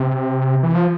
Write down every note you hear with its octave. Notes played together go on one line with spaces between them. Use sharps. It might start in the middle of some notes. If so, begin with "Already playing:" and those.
Already playing: C3
E3
F3